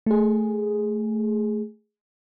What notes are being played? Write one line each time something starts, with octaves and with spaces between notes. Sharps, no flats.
A3 G#4